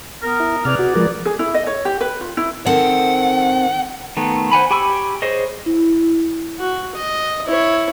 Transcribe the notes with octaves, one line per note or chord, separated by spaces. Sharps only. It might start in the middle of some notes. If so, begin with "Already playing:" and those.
B3 A#4
E4
C3 G#4 B4 D5 F6
F#4
F3 G#3 A#4
G#4
E4
D#5
C#5
G4
B4
F4
E4
D#3 C4 A4 F#5
D#3 A3 B3
C5 F#5 G#5 B5
G4 G#5 B5 C#6 E6
G#4 C5 C#5 D#5
E4
F#4
D#5
E4 C#5